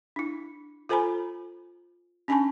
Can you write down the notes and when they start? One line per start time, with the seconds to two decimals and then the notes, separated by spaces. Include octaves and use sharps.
0.16 D4 E4
0.89 F4 A4 C5 G#5 A#5 B5
2.28 C#4 D4 G#5 A5 B5 C#6